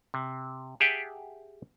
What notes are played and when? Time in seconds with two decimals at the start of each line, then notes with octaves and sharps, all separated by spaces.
0.14 C3
0.80 G4 G#4 E5 F#5 G5 A5